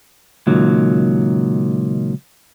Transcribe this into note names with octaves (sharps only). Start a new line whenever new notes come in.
C#2 A#2 D#3 F#3